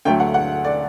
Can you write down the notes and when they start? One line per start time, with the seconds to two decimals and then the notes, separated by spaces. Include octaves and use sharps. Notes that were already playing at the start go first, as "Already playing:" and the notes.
0.05 D2 D3 F#3 A3 G5
0.20 F#5
0.34 F#5
0.65 D5